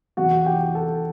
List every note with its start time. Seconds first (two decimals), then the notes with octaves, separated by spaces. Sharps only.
0.17 E2 C3 E3 F#4 F#5
0.46 G4 G5
0.75 A4 A5